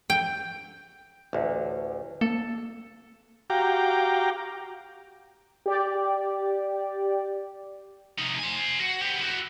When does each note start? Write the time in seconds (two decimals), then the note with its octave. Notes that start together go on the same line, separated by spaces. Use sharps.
0.10 G5
1.33 A1 D2
2.21 A#3 A4
3.50 F#4 G4 F5 G5 A#5 D6
5.66 G4 D5
8.18 C3 D#4
8.39 C5 G#5
8.79 F#4
9.02 B3 G4
9.21 E4 F#4